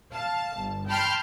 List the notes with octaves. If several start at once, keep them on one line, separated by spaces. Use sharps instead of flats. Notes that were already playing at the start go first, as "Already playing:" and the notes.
F5 A5
G1
G5 A5 B5 C6 F6 G6